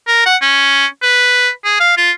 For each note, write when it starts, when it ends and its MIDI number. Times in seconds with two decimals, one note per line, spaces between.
0.07 0.23 70
0.26 0.36 78
0.42 0.86 61
1.03 1.49 71
1.65 1.76 68
1.80 1.94 77
1.97 2.11 65